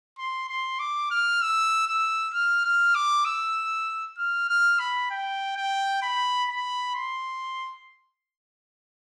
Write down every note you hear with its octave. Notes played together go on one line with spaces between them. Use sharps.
C6
C6
D6
F6
E6
E6
F6
F6
D6
E6
F6
F6
B5
G5
G5
B5
B5
C6